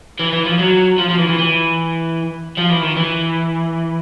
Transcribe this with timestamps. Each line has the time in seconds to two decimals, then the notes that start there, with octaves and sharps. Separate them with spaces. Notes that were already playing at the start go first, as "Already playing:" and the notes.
0.19 E3
0.32 E3
0.45 F3
0.59 F#3
0.98 F3
1.09 F3
1.18 E3
1.28 E3
1.38 E3
2.57 F3
2.70 E3
2.83 D#3
2.96 E3